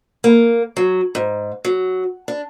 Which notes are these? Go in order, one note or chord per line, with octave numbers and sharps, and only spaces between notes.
A#3
F#3
G#2
F#3
D4